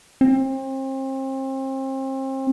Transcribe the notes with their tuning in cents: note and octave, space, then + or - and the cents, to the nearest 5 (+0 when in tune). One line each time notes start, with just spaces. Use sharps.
C4 +35